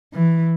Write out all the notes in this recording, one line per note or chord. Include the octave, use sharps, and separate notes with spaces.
E3